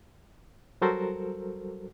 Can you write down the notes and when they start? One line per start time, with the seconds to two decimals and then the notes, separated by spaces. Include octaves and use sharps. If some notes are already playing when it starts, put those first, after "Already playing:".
0.82 F#3 G3 F#4 A4 A#4 C5